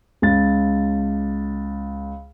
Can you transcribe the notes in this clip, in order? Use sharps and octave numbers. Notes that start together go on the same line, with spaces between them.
C#2 A6